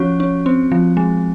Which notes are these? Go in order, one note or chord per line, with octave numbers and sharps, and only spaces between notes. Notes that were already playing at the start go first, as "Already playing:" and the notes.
Already playing: F3 C#4 F#4
C#4
C4
F3
G#3